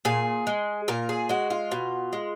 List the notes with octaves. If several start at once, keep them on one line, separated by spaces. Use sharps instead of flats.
A#2 G#4
G#3
A#2 A#4
G#4
G#3 F#4
F4
B2
G#3